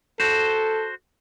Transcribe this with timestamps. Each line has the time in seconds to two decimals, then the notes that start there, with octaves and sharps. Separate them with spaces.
0.20 F#4 A4 C5